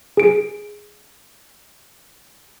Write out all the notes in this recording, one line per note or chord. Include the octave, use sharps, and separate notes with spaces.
G#4 D7